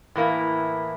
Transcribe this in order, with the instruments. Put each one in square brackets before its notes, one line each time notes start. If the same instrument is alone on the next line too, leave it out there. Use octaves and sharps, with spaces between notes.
[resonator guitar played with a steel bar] A2 E3 A#3 E4